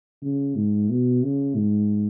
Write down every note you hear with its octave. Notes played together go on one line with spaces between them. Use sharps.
C#3
G#2
B2
C#3
G#2